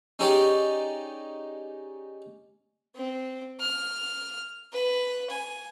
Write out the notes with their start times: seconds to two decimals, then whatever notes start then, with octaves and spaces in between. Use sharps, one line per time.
0.19 C#4 D#4 G4 G#4 C#5 D5
2.96 C4
3.60 F6
4.73 B4
5.30 G#5